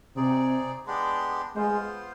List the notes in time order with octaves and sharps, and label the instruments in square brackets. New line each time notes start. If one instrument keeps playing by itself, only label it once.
[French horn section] C3 [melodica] C4 D#4 G#4 D5
[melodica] G#3 B3 D4 G4
[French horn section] G#3 [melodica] B3 F4 C5